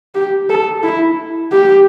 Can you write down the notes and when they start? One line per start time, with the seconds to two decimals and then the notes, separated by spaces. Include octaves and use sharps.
0.15 G4
0.50 A4
0.83 E4
1.52 G4